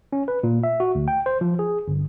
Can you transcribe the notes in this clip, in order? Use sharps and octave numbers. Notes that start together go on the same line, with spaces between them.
C#4
B4
A#2
E5
F#4
D2
G5
C5
F3
G#4
G1